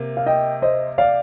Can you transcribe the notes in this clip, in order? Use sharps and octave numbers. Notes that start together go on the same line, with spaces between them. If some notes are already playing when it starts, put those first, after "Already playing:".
Already playing: C3 A#3
F5
D#5 G5
C5 D#5
D5 F5